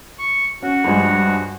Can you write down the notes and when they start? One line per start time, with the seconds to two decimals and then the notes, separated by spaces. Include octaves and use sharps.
0.19 C#6
0.63 C#4 F#4
0.84 G2 F3 G#3